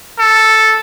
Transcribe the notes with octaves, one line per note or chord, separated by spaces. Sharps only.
A4